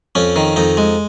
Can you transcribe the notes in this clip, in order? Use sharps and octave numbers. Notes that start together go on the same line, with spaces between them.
F2 C#4
D#3
F2 D#4
G#3